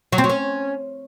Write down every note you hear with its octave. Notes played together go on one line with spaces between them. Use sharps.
F#3
C4
F#3
C#4